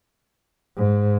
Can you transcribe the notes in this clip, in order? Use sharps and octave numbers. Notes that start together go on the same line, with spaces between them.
G#2